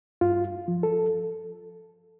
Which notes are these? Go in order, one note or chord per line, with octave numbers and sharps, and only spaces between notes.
G2 F4
F3
A4